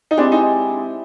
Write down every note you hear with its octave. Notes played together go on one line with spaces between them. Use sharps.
D#4
G#3 C4 D4 E4 G4
D#4